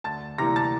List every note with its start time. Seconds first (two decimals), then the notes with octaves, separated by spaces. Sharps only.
0.04 D2 A5 A6
0.38 C3 E3 G3 A#3 A#5 A#6
0.56 A5 A6